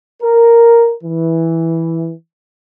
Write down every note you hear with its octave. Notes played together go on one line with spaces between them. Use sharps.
A#4
E3